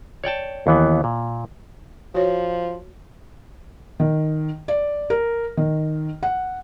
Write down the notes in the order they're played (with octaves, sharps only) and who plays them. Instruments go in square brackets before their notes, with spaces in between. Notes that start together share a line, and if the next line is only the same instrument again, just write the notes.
[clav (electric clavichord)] C#5 D5 G5 A5
D#2 E3 B3
A#2
[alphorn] F3 [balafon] F#4 C#5
[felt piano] D#3
D5
A#4
D#3
F#5